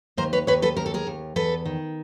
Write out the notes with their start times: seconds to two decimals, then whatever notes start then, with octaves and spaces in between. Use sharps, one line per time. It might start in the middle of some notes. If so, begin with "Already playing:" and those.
0.17 D#2 A#4 C5
0.33 B4 C#5
0.47 D#2 B4 C#5
0.62 A4 B4
0.77 D#2 A#4
0.86 A4
0.94 G#4 A#4
1.07 D#2
1.36 E2 A4 B4
1.66 D#3